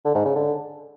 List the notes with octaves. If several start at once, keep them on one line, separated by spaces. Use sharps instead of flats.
D3
G#2
C#3
D3